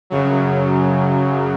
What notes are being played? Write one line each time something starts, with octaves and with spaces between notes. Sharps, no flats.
F#2 C#3 F#3